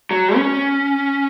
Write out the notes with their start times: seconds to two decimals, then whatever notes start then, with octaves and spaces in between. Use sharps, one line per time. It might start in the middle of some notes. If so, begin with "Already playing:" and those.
0.11 F#3
0.36 C#4